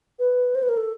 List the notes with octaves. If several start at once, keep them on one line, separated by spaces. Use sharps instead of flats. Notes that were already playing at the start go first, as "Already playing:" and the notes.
B4
C5
B4
A#4
A4